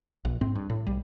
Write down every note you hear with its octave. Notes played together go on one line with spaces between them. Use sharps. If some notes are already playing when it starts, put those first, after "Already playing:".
A#1
G#2 C4
G2
A2
B1 G3